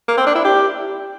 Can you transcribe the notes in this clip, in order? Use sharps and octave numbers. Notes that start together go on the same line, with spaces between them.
A#3
C4
D4
E4
G4